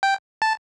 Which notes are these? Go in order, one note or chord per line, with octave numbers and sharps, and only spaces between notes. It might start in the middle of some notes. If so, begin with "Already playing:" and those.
G5
A5